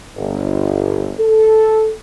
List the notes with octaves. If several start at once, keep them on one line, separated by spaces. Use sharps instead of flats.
G1
A4